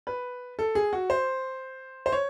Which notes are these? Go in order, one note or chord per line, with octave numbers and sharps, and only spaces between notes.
B4
A4
G#4
F#4
C5
C5
C#5